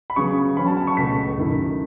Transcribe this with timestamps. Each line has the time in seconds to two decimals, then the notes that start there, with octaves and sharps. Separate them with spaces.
0.10 B5
0.16 C#3 F#3 B3 C#6
0.57 C#3 F#3 C#4 B5
0.67 A5
0.77 A5
0.87 C#6
0.97 C#2 B2 A3 B6
1.38 F#2 D#3 A3 E4